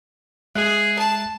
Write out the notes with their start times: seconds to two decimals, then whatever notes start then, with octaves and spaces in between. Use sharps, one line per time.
0.55 G#3 G#4 E5 F#6
0.99 A5